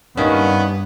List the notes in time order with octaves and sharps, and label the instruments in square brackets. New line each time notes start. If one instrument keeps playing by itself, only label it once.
[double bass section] G2 [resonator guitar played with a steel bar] D#3 A#3 C#4 [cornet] B3